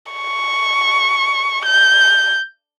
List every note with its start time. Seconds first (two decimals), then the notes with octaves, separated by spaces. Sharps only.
0.13 C#6
1.66 G6